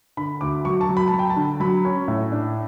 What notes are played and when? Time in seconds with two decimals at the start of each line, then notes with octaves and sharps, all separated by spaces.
0.17 D3 B5
0.41 D2 D6
0.65 F#3 C#6
0.81 A5
0.89 F#3
0.97 B5
1.07 F#3 A5
1.19 G5
1.30 A5
1.36 D3
1.60 F#3 B5
1.85 C#4
2.08 A2
2.32 D4